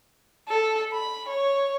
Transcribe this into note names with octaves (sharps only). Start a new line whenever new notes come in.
A4
B5
C#5